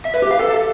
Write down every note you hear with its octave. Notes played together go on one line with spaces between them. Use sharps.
E5
B4
G4
F5
A4